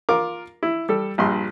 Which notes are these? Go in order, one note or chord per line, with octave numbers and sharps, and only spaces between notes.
F4 A#4 D6
E4
G3 A4
A#1 G2 C6